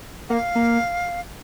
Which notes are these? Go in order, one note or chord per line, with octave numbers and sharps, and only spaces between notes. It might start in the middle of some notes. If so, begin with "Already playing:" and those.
A#3 F#5
F5
A#3